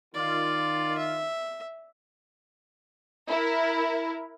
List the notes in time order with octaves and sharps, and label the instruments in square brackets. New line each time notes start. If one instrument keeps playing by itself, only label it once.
[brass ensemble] D#3 F4 [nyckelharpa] D5
[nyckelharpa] E5
[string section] E4 A#4